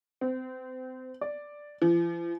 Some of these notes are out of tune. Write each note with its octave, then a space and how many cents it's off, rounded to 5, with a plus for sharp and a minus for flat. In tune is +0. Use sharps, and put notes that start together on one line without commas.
C4 -30
D5 +0
F3 -45